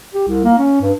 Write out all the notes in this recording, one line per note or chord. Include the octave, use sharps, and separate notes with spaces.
G4
C2
A#3
C#4
G2